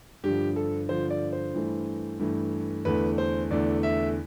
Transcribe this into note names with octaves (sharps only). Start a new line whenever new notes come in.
G2 D3 F3 G4
A4
G2 D3 F3 C5
D5
C5
G2 E3 A3
G2 E3 A3
E2 D3 A3 B4
C5
E2 D3 A3 D5
E5